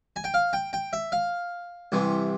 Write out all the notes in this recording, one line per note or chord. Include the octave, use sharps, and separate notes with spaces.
G#5
G5
F5
G5
G5
E5
F5
C2 C3 E3